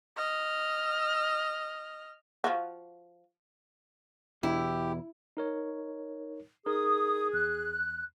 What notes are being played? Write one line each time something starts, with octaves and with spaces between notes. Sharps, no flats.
D#5 F6
F3 F4 F#4
E2 B2 E4 G4
D#4 A#4 C#5
D#4 G#4 A#4 D#6
E2 F#6